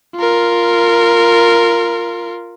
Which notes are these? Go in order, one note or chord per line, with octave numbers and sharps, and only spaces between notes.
F4 A#4